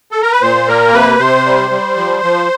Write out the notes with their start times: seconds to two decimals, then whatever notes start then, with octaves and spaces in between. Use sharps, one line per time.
0.12 A4
0.22 A#4
0.32 B4
0.42 A#2 C5
0.68 A#3 A#4
0.93 C3 B4
1.19 C3 C5
1.46 G3
1.71 G3
1.97 F3
2.23 F3